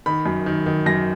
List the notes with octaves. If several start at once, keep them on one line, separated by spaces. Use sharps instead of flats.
D#3 B5
F#2
D#3
D#3
F#2 A#6